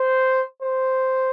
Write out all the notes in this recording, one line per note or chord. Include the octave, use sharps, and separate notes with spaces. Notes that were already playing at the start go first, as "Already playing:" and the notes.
Already playing: C5
C5